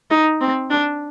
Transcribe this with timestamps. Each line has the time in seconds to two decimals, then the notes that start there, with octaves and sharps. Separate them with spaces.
0.11 D#4
0.41 C4
0.70 D4